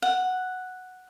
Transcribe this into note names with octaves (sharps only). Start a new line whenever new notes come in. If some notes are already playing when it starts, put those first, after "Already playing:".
F#5